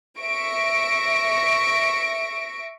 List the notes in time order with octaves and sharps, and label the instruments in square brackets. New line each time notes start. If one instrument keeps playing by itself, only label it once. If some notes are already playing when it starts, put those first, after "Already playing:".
[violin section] E5 C#6 A#6 D7